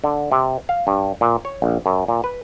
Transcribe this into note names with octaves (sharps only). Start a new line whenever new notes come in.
D3
C3
F5
G2
A#2
C#5
A#1
F#2
A#2
B4